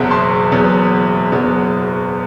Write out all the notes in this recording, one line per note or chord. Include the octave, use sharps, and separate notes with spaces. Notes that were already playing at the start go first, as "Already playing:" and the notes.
Already playing: F#1 E2 B2 F#3 B3 E5
A5 C6
F#1 E2 B2 F#3 B3
F#1 E2 B2 F#3 B3